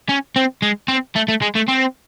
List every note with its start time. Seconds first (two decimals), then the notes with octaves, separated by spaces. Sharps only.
0.09 C#4
0.36 C4
0.62 G#3
0.88 C4
1.16 A3
1.28 A3
1.42 G#3
1.56 A3
1.68 C4